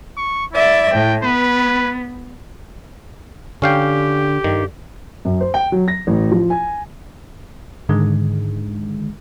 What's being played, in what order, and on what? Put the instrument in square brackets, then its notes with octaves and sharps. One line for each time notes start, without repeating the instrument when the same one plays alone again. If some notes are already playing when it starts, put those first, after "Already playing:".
[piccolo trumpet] C#6
[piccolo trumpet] E4 [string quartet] D5 E5
[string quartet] A2 [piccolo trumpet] G5
[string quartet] B3 [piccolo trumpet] B4
[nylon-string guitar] D3 [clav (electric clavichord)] C#4 F5 G5 [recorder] G4
[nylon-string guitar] G2 [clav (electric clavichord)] D#3
[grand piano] F#2
C5
G5
F#3
A#6
A1
F3
G#5
[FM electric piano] G#2 D3 D#3 G#3